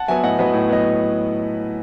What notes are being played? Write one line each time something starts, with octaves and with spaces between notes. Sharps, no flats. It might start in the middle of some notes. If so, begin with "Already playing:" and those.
Already playing: F#5 A5
F#3 B3 E5 G#5
A2 D#5 F#5
F#3 B3 B4 D#5
A2
F#3 B3 D#5